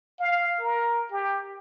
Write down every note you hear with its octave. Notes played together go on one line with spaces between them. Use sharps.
F5
A#4
G4